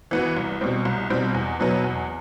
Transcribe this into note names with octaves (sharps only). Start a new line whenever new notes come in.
E3 B3 F#4
C2
B2 G3 C4
C2
B2 G3 C4
E2
B2 F#3 B3
E2